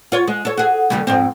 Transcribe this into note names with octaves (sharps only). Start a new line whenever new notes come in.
F4 C#5
G#3
A4 C#5
F#4 G#4
D#2 C#3 G3
F2 G#2 C4